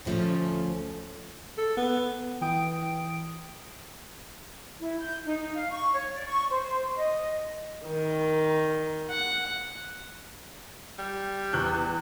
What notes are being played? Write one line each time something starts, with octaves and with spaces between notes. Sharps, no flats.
D2 C#3 F3 G#3 A3 C#4
A4
B3
E3 G5 D#6 D7
E4
G6
D#4
F5
C#6
C#5
D5
C#6
C5
D#5
D#3
F#5
G3
E2 F#6 G6